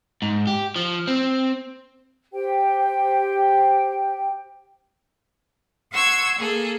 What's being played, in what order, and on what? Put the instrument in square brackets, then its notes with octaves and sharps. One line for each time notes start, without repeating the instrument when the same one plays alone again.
[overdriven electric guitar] G#2
G4
F3
C4
[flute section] G4 C5 G5
[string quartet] F#5 C6 C#6 E6 G#6
A#3 G#4 A4